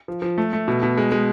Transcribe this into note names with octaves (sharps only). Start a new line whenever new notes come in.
F3
F3
A3
A3
B2
B2
G#3
G#3